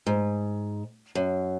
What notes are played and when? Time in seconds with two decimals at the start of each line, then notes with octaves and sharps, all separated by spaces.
0.06 G#2
1.15 F#2